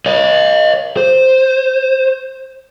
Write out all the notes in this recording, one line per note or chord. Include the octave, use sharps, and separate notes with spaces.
C#5 D#5
C5